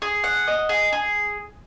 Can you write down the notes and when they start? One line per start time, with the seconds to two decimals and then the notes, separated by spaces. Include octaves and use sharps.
0.02 G#4
0.24 F#5
0.47 D#5
0.69 G#4
0.93 G#4